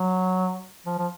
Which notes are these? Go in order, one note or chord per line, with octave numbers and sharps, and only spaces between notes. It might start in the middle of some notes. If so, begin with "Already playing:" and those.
Already playing: F#3
F3
F3